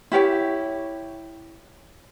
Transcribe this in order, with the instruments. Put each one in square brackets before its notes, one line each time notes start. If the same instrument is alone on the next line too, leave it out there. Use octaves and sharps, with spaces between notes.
[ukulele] E4 G4 C#5 G5